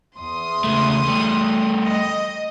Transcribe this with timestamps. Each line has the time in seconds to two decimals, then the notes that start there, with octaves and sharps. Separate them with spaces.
0.18 E2 C6 D#6
0.64 C#2 A3
1.08 G3 A3
1.85 D#5